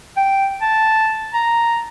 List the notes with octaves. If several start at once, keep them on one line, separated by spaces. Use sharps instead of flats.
G5
A5
A#5